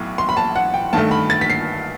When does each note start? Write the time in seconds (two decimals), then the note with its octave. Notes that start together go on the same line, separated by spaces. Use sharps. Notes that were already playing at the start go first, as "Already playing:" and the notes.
Already playing: B1 A2
0.18 C6
0.29 B5
0.37 A5
0.56 F#5
0.74 G5
0.93 G2 D#3 A3 A5
1.11 B5
1.30 A6
1.41 B6
1.50 C7